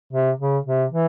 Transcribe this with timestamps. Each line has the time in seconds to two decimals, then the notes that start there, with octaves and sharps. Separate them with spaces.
0.13 C3
0.40 C#3
0.66 C3
0.92 E3